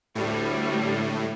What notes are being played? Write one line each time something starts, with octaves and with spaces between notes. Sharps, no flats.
D2 A2 G3